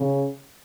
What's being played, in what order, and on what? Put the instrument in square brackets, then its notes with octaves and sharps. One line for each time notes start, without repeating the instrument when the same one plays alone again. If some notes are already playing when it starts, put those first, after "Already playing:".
Already playing: [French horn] C#3